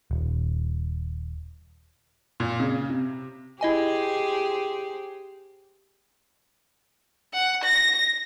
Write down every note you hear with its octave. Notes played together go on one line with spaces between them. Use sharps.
D#1
A#2
C#3
C3
E4 G4 G#4 C5 D#5 G#5
F#5
A#6